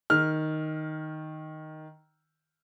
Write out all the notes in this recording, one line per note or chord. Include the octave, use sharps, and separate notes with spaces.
D#3 F6